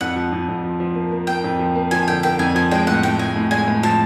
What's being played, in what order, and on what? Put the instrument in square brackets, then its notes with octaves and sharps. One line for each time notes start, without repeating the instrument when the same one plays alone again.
[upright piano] F2 [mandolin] F#5
[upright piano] F3
F2
F2
F3
F3
A#3
A#3
[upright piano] A#3 [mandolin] G5
[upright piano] F2
F3
A#3
[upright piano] F3 [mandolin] G#5
[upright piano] D3 [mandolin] G5
[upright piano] A#3 [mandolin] G5
[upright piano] F2 [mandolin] G#5
[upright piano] F3 [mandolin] G#5
[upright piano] G#3 [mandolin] G5
[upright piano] A2 [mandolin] F#5
[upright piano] A2 [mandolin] G5
[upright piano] G#3 [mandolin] G#5
[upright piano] A2
[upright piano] G#3 [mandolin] G#5
[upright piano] A2
[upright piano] F3 [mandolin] A5